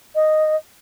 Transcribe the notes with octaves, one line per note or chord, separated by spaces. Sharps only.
D#5